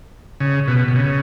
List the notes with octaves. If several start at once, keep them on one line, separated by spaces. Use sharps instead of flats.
C#3
B2
B2
C#3